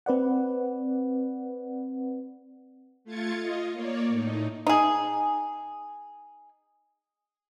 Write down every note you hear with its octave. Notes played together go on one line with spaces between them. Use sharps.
C4 B4 D5 F#5
A3 F4 G#6 A6 C#7
F4 D#5
A#3 C#5 D5
A2 D#4
D#4 G#4